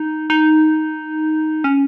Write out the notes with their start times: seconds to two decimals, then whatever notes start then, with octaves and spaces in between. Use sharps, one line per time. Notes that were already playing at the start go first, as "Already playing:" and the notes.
Already playing: D#4
0.30 D#4
1.64 C#4